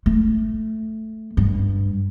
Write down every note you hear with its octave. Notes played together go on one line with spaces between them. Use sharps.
A3
G2